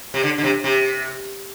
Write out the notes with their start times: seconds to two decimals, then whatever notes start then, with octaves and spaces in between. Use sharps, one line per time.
0.14 C3
0.23 D3
0.38 D3
0.44 C3
0.64 C3